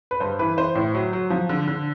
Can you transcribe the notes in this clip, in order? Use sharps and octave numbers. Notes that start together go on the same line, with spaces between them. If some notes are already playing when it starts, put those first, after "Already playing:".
B4
G2 C5
E3 B4
E3 C5
A2 C5
F#3
F#3
F3
D3
D3